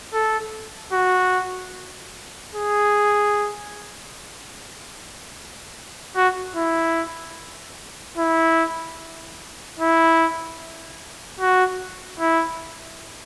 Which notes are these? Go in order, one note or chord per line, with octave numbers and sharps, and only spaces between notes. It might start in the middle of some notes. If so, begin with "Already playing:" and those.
A4
F#4
G#4
F#4
E4
E4
E4
F#4
E4